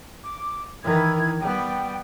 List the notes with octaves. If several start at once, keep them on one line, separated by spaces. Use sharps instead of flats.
D6
D#3 E3 E4 G#6
G3 B3 G5